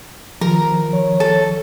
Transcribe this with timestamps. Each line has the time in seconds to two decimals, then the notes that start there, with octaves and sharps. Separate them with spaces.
0.41 D#3 F3 A#4
0.93 C#5
1.20 A4